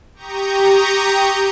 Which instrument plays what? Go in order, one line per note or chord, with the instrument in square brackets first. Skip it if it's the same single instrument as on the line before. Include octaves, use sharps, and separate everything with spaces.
[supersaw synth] G4 A#5 C#6 D#6 G6